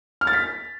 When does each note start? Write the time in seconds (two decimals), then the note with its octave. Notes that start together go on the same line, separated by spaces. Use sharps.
0.21 F6
0.27 A6
0.33 B6